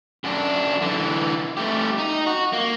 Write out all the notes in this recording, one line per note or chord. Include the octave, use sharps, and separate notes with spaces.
F#2 D4
D3 E3
A3 G4
D#4
F#4
A#3